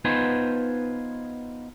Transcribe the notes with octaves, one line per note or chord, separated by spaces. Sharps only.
B3 D#4 F4 B4 C5 G#5